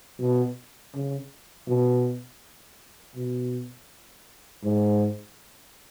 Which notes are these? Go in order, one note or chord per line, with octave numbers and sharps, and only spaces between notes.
B2
C#3
B2
B2
G#2